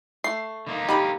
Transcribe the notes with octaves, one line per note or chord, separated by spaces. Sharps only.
A3 C7
D3 A#3 D#4
D#3 G4 B5